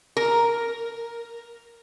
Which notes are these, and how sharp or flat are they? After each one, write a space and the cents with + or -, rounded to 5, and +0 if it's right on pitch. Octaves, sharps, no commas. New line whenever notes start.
A#4 +0